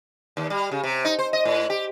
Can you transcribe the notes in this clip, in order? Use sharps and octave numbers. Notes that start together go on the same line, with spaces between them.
D#2
G3
C#3
C3
D#4
C5
D#5
A2
G4